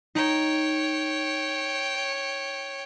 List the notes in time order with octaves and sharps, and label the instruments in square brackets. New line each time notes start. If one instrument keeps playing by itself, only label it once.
[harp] D#4 [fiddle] C#5 G5